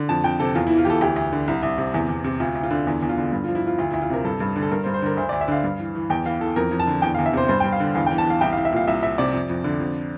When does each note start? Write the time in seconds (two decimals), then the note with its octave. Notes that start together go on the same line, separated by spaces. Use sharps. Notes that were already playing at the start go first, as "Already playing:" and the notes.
Already playing: D3
0.09 F2 A5
0.24 F2 G5
0.40 C3 A4
0.55 E2 F4
0.67 E4
0.70 E3
0.78 F4
0.85 E3 G4 A4
1.01 D2 G4
1.16 D2
1.33 D3
1.48 C2
1.63 C2
1.78 C3
1.94 E2
2.09 E2
2.24 C3
2.40 D2 F4
2.55 D2
2.63 F4
2.71 D3
2.87 E2
3.02 E2
3.09 F4
3.17 D3
3.32 G2
3.44 F4
3.48 F3
3.55 E4
3.64 F3 F4
3.79 D2 F4
3.90 E4
3.94 D2
4.01 F4
4.10 C3 A#4
4.25 G2 A4
4.40 G2
4.56 D3
4.62 A4
4.72 G2 A#4
4.83 C5
4.86 G2
4.94 C5
5.02 D3 A#4
5.17 D2 C5
5.29 D5
5.33 D2
5.41 E5
5.48 D3 F5
5.64 G2
5.79 E3
5.95 E3
6.10 E2 G5
6.25 E3 F5
6.40 E3 A4
6.56 F2 A#4
6.72 F2
6.80 A5
6.87 D3
7.02 E2 G5
7.15 F5
7.19 E2
7.26 E5
7.33 C3 C5
7.48 G2 C5
7.60 G5
7.64 G2
7.72 F5
7.80 D3
7.95 E2 F5
8.06 G5
8.11 E3
8.18 A5
8.26 E3 F5
8.41 C2 G5
8.53 F5
8.57 C2
8.65 E5
8.73 A#2 F5
8.87 C2 E5
9.03 C2 E5
9.18 C3 D5
9.33 F2
9.50 F2
9.64 D3
9.80 F2